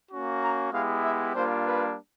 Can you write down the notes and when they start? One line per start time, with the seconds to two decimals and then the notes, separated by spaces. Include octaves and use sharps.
0.11 A#3 C#4 F#4
0.42 A#5
0.72 G#3 B3 E4 G4 F5
1.03 E5
1.33 G3 A#3 D4 F4 C5
1.64 B4